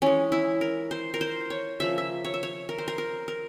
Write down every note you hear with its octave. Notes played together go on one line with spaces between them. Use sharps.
E3 G#3 C#4
E4
A#4
C5
A#4
C5
C#5
C#3 F3 A#3 E5
E5
C#5
E5
C#5
A#4
C5
A#4
A#4
A#4